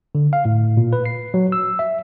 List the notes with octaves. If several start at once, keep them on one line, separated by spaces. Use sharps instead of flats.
D3
F5
A2
A#2
B4
C7
F#3
E6
E5